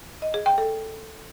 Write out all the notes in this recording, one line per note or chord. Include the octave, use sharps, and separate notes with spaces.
D#5
G#4
G5
A4